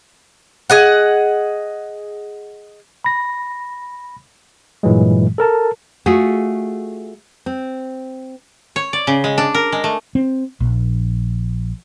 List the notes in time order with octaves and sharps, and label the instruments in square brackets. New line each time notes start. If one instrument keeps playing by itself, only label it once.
[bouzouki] G#4 D#5 F#5
[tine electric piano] B5 A#6
G2 A#2 E3 F#3 G#3
A4 A#4 A5
[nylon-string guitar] A3 F4 F#4 G#4
C4
[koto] C#5
D5
C#3
G#3
D4
A#4
G#3
A3
[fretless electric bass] C4
A#1